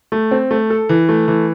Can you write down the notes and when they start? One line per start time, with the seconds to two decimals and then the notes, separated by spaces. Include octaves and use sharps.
0.12 A3
0.31 C4
0.51 A3
0.70 A4
0.89 E3
1.09 A3
1.28 E3